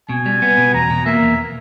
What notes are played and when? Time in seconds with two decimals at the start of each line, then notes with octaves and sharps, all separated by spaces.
0.09 B2 G#5
0.26 G3
0.42 B3
0.58 B2
0.74 E2 A#5
0.90 B2
1.06 A#3 E5
1.22 E2